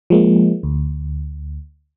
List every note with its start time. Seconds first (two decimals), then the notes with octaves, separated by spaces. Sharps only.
0.10 F3 G#3 A#3
0.63 D2